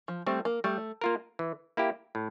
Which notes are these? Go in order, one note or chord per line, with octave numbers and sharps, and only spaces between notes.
F3
G3 A3 C4
A#3
G3 A3
A#3 F4 A#4
E3
A#3 E4 G4
A2